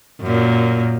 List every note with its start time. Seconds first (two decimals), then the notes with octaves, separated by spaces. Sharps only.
0.21 F#2 A#2